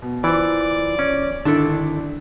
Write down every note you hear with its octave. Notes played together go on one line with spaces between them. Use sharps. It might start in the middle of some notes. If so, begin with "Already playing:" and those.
B2
E3 F4 C5 D5
C#4
G#1 D3 D4 E4 A4 A5